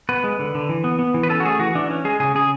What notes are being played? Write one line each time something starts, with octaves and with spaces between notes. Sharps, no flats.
B3 B4
G#3
D3
D3
E3
B3
B3
E3
B4
C#4 A4
F#4
A3 G#4
E3 F#4
E3 D4
C#4
G#3 G#4
C#3 G#4
C#3 G#4